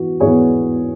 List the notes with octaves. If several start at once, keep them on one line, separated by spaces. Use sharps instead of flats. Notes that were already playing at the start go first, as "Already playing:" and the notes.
Already playing: E3 B3 F#4
E2 E3 B3 G#4 C#5